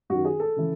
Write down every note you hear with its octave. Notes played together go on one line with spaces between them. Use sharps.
F#2 D#3 F#4
G#4
A4
C#3 E3